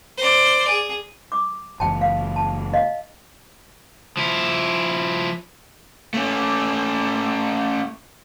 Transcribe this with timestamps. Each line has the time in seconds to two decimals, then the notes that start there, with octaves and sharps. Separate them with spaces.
0.18 C5 D5
0.69 G#4
1.32 D6
1.80 F#1 E3 G5 A5
2.01 F5
2.36 A5
2.73 D#5 F5
4.17 F3 E4
6.14 A3 C#4